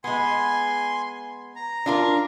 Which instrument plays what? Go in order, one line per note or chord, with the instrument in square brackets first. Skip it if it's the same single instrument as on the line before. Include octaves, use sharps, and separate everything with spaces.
[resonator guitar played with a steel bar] G#3 B3 [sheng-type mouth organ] G#5 C6
[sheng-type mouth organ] A#5
[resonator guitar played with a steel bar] D4 F4 A#4